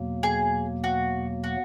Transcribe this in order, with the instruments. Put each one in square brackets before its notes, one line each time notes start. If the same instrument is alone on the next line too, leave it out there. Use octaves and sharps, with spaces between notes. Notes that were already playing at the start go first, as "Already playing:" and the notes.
Already playing: [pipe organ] E2 B2 F#3 A#3
[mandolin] G#4
F#4
F#4